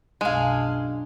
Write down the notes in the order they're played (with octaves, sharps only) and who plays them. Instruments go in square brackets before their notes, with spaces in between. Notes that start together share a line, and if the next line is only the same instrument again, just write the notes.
[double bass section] B1 F#2 [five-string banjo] G#3 [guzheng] D4 F4 [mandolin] F5 G#5